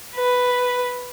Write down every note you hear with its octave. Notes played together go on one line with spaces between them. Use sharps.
B4